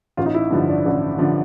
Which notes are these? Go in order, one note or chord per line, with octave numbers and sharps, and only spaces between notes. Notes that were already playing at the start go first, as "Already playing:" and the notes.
A1 F4
D#4
E4
G2 D3 F3
D4
A1 D4
D3 F3